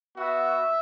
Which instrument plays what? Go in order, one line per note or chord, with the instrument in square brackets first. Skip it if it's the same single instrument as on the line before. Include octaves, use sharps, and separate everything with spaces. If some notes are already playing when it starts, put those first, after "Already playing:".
[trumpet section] B3 F#4 E5